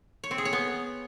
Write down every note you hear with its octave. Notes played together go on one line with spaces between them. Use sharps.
C#5
C4
G#4
C#5
B3